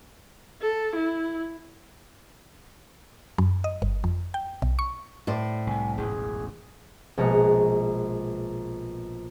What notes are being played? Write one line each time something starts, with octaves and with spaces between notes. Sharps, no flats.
A4
E4
F#2
D#5
G1
F2
G5
B1
C#6
A2 C5 D5
C2 C3 G#5
E1 A1 F#2 G#4
A#1 B2 G#3 A#5 F#6 C#7